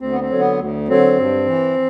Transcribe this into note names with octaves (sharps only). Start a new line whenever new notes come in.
D2 C4
B3
C4
D3 F#3
B3
D2
D3 F#3 C4
G2
E3